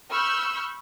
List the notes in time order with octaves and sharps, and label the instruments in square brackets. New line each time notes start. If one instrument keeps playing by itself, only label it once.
[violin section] B5 C#6 E6 F6 G6